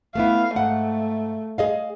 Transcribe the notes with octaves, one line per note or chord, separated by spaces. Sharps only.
A3 B3 E4 F5
G#2 A3 F#5
G#4 D#5 F5